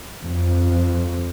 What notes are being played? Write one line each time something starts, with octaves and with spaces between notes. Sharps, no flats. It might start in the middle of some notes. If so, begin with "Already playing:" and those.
F2